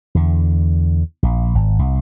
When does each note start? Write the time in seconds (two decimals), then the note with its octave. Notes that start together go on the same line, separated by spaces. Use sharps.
0.15 E2 D3
1.23 A#1
1.55 G#1
1.79 C2